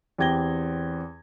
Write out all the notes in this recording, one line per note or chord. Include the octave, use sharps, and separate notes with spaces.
E2 C4 G4 G#6 A#6 G7